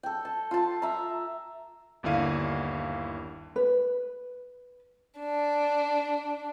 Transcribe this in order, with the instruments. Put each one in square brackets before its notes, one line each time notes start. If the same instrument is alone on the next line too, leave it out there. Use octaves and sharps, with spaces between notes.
[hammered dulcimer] A4 G5
A5
F4 A5
E5 A#5
[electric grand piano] G1 D#2 D3 E4 F5 D#7
[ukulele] B4
[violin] D4